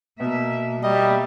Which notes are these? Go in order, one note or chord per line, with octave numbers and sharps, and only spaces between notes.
B2 A#3 E5
G3 A#3 D#5 E5